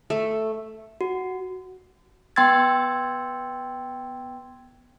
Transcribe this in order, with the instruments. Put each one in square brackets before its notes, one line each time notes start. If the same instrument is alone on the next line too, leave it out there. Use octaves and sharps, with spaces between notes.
[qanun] A3
[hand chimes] F#4
B3 G5 C6 E6 G#6 A6